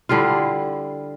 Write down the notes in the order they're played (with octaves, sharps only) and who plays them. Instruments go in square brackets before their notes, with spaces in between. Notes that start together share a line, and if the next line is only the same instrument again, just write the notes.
[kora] D3 G3 E4 F4